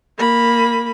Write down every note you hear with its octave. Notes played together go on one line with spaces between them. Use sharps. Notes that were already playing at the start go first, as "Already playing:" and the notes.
A#3 B5